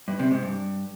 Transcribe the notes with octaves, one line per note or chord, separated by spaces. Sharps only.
G2
C3
G#2
G2